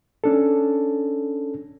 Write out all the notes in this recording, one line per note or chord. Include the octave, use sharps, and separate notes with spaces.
C#4 D4 A4